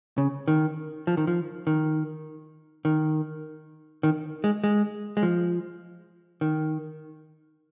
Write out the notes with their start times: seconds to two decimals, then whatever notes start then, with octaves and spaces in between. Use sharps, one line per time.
0.18 C#3
0.48 D#3
1.07 F3
1.17 D#3
1.27 F3
1.67 D#3
2.85 D#3
4.03 D#3
4.44 G#3
4.64 G#3
5.17 G#3
5.23 F3
6.41 D#3